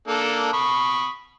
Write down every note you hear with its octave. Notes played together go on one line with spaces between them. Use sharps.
A#3 D4 A4
B5 C#6 D#6